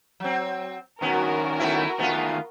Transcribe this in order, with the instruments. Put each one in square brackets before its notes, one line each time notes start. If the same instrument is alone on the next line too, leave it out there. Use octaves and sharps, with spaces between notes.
[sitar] F#3 C4
[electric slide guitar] D#3 C#4 [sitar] B3 [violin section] F#4 A#4
[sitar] A3 B3 E4
[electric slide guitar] D#3 A3 G#4 [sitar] B3 F4